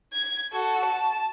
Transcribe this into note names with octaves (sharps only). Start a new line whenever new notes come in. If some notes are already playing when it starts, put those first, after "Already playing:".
G#6
F#4 A4
A5